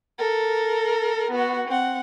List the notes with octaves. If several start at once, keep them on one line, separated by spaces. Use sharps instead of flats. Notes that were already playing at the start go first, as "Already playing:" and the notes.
A4 A#4
B3 F#4
C4 F#5